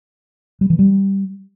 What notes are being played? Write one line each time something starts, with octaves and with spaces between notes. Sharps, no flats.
G3
E3
G3